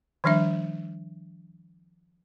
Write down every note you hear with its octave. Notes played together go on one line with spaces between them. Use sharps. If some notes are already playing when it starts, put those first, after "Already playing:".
D#3 F3 G3 D4 E5